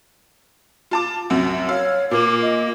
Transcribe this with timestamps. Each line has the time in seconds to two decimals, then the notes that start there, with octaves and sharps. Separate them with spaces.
0.91 F4 A5 D6
1.30 C2 F#2
1.69 C#5 F5 E6
2.11 A#2 A#3 D6
2.42 D#5